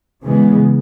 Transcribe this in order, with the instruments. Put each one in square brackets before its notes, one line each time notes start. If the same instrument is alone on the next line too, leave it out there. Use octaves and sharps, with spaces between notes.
[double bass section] C#3 E3 G#3 B3